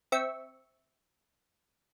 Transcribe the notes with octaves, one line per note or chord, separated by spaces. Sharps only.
C4 E5 C#6